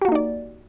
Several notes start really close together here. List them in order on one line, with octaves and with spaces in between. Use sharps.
G4 F#4 A#3 D#4 D5